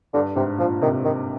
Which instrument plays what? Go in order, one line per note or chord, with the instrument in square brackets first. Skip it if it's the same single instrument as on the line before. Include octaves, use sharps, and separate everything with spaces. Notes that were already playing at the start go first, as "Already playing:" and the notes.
[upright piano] G2 [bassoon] D3
[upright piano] G#2 [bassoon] C3
[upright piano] A#2 [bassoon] F3
[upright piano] C3 [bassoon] D#3
[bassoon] D#3